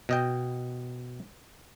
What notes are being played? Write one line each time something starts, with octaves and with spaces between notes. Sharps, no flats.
B2 D#5 G5